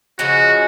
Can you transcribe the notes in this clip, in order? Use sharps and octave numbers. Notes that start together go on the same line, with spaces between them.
C#3 F3 G#3 C#4 F#4